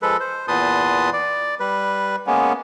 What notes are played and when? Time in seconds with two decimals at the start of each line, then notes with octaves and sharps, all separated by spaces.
0.02 F3 G#3 A4 B4
0.20 C5
0.48 E2 A#2 B4 A5 C6 D#6
1.13 D5
1.60 G3 B4
2.27 G#3 A#3 B3 C#4